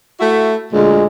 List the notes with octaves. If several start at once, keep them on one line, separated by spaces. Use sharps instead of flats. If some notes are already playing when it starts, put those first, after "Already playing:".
A3 E4 F#4
D2 A#2 G#3